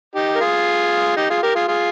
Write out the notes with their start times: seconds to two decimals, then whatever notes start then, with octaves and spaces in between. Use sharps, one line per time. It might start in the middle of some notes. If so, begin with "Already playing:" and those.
0.15 D#4 G4
0.35 A#4
0.41 F4 G#4
1.17 D#4 G4
1.30 F4 G#4
1.43 G4 A#4
1.55 F4 G#4
1.68 F4 G#4